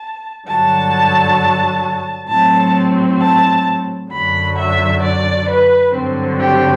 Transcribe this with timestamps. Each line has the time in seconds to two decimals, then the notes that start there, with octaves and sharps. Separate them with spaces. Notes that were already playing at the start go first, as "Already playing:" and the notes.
Already playing: A5
0.47 G2 D3 F#3 A5
2.29 A2 F#3 C4 A5
3.20 A5
4.11 F#2 D3 F#3 B5
4.57 E5
5.03 D5
5.48 B4
5.94 G2 D3 F#3 C4
6.40 G4